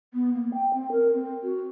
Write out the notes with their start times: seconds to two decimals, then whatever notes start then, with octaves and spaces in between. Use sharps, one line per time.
0.13 B3
0.33 A#3
0.53 G5
0.73 C4
0.91 A#4
1.13 C4
1.43 F#4